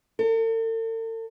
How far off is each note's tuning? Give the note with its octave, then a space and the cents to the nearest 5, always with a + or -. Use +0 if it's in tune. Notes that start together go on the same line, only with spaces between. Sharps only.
A4 +45